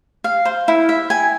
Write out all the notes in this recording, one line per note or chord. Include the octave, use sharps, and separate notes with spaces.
F5
C5
E4
E5
G#5